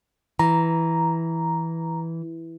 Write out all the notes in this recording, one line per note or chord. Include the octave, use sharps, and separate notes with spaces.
E3 A#5